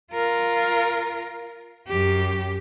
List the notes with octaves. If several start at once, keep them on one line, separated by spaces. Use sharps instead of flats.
F4 A#4
F#2 G4